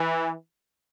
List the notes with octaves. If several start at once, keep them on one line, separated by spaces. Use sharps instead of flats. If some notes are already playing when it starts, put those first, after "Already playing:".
Already playing: E3